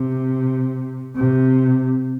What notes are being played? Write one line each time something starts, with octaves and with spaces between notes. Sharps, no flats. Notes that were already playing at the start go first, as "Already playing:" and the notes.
Already playing: C3
C3